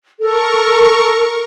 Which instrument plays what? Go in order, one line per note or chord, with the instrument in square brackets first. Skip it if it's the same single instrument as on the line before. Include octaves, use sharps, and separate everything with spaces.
[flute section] A4 [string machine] A#4 C#6